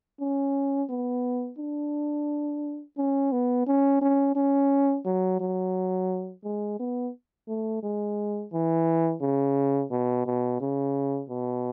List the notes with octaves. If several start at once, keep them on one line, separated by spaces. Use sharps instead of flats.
C#4
B3
D4
C#4
B3
C#4
C#4
C#4
F#3
F#3
G#3
B3
A3
G#3
E3
C#3
B2
B2
C#3
B2